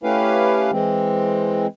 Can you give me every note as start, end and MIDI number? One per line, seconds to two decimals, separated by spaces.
0.03 0.71 57
0.03 0.71 61
0.03 0.71 64
0.03 0.71 67
0.03 0.71 71
0.03 0.71 77
0.72 1.67 52
0.72 1.67 56
0.72 1.67 60